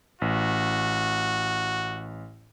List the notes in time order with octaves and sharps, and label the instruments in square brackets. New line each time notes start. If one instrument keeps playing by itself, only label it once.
[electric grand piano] A1 [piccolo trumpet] F#4